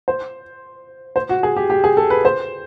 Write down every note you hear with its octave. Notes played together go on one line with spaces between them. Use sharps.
C5
C5
F#4
G#4
G4
G4
G#4
A4
B4
C5